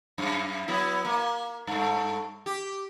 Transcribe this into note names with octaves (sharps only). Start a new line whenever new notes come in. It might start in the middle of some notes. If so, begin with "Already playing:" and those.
F#2
F#3 B3 E4
A#3
G2 A3
G4